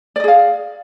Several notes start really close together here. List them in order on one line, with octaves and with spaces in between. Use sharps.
D5 D#5 G#4 F5